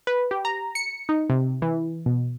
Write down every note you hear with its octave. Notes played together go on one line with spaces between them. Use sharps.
B4
G4
A#5
C#7
D#4
C3
E3
B2